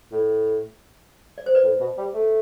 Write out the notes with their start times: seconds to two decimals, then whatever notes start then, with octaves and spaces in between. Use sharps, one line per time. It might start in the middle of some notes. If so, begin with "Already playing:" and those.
0.12 A2
1.38 D5
1.46 C5
1.55 B4 D5
1.63 A2
1.80 B2
1.98 G3
2.14 A3